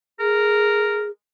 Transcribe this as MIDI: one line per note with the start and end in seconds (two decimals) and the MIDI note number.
0.20 1.10 68
0.20 1.05 70